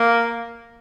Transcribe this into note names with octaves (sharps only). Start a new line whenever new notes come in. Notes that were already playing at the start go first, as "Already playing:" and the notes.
Already playing: A#3